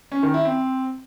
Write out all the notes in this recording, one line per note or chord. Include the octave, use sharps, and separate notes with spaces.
C#4
D#3
E4
C4